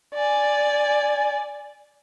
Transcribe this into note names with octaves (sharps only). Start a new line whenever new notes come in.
D5 G#5